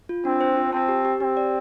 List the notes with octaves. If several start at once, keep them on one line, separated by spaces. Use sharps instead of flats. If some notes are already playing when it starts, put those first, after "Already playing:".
F4
C4 D4
C5
F4
C4 A5
G4
G4
C4 G4
D5